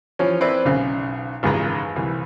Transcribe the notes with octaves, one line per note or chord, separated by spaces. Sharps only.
E3 F3 C#4
C4 E4 B4 D5
B1 C#3
G#1 C#2 E3 G#4 B4 A#5
C2 E3